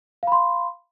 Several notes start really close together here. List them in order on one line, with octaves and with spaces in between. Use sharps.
F5 B5 C6